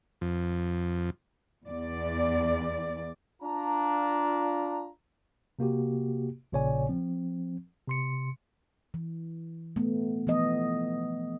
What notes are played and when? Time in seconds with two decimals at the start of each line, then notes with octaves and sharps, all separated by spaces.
0.21 F2
1.67 E2 D5
3.42 D4 F4 A#5
5.59 C3 A#3 F#4 G4
6.52 A#1 A#2 C#3 C#5 D5 G#5
6.89 F3 C4
7.88 C3 C6 C#7
8.94 E3
9.76 A3 B3
10.27 E3 F3 B3 D#5